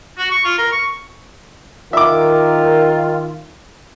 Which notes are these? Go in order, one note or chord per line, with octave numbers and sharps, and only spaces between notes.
F#4
C#6
F4
A#4
C#6
D#3 F4 A#4 E5 D6